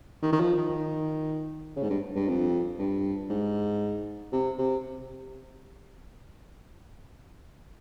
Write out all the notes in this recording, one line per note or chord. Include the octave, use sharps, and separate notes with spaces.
D#3
D#3
F3
D#3
C#3
G#2
G2
G2
F2
G2
G#2
C3
C3